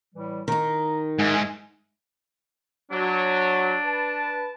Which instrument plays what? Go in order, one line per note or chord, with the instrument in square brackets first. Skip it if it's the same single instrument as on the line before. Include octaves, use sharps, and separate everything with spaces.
[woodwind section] A2 E3 G3
[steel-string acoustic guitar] D#3 D#4 [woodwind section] A#5
[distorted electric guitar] G#2 [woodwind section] D#5 E5 G#5
[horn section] F#3 [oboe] D4
[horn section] B4 A5